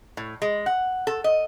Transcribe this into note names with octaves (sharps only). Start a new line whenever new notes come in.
A2
G#3
F#5
A4
D#5